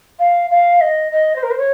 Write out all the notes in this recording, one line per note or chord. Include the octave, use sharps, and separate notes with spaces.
F5
F5
D#5
D#5
C5
A#4
C5
C#5